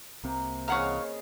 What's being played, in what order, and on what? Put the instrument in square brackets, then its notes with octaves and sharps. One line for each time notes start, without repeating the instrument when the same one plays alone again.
[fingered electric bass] C2 C4 [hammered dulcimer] C3 A#3
[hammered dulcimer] C#3 G#4 D#5 [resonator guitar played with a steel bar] E3 F#5 A#5 [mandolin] C#5 F5